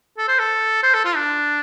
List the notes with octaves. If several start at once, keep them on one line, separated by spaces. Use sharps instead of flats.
A4
C5
A4
C5
A4
F4
D4